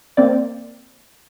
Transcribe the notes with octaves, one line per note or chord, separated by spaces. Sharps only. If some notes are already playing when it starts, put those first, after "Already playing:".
A#3 C4 D5